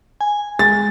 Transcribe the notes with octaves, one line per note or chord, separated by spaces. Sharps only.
G#5
G#3 A6